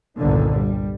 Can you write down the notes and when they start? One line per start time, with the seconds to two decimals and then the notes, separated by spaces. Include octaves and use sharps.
0.17 G1 C2 A#2 D3 D#3
0.53 G3